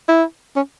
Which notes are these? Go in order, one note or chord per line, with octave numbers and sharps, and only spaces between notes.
E4
C#4